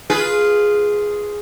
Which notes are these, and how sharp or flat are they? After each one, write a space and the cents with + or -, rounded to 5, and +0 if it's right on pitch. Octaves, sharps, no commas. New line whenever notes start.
F4 +0 G#4 +0 B4 -10